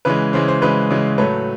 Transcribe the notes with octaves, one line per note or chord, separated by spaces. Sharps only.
C#3 E3 G#3 B4
C#3 E3 G#3 C5
C5
C#3 E3 G#3 B4
C#3 E3 G#3
A2 F#3 A3 B4